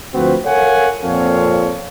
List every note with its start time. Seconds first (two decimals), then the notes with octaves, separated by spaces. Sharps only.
0.14 D2 F3 C4 F#4 B4
0.46 A4 A#4 C#5 F5 F#5 G#5
1.04 F2 A#2 C4 A4 C#5 F5